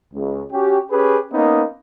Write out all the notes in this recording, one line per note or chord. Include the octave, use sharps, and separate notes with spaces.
C#2
C#4 F#4 G4
C#4 G4 G#4 B4
A#3 B3 C#4 D#4